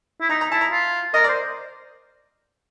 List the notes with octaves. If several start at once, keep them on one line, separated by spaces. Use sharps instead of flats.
E4
D#4 A#5
A#5
E4 A5
A#5
F4
A#4 D#5
D5
C5